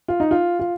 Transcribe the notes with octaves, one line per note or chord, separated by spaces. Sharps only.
F4
D#4
F4
F4